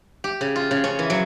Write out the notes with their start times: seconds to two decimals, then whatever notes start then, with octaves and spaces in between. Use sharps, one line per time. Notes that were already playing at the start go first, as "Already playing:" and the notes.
0.24 G4
0.41 C#3
0.56 F4
0.71 C#3
0.84 C#4
0.99 E3
1.10 F#3